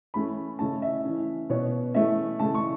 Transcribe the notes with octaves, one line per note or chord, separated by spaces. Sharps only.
E3 A3 C#4 B5
C#3 A3 C#4 A5
E5
E3 C#4
B2 B3 C#5
E3 A3 C#4 E5
C#3 E3 A3 A5
C#6